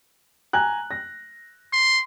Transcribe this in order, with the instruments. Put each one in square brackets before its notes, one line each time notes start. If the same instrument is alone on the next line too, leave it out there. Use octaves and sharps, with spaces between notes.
[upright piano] G#5 A#5 F#6
A#6
[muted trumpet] C6